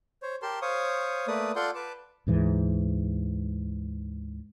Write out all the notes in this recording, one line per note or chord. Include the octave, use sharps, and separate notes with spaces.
C5 C#5
G4 A#4 A5 C6
C5 C#5 F5 C#6 D#6
A3 A#3 B4 D5 D#6
F4 A4 D5 F#5 C6 G6
B4 A5 D6
D2 G#2 E3